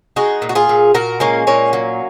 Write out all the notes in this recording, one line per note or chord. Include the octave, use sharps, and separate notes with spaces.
G#3 D#4 F#4
A#2
F#4
F4 G#4
A#2
A#2 F#4 A#4
G#3 A#3 C#4
A#2 A#3 C#4
F#3